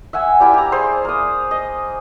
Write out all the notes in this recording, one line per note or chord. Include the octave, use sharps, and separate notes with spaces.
E5 F#5 G#5 E6
A#3 E4 G4 D5
G4 A#5
G#4 C5
A#3 D#6
D#5